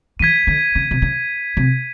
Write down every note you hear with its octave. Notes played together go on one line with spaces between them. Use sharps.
E3 G#6 B6 D#7
D3
C#3
C3
C#3
C3